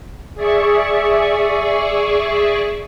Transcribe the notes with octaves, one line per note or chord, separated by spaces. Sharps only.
G#4 D5 E5 C#6